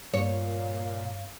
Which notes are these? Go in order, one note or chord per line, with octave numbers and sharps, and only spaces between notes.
G2 A#2 C#5 F5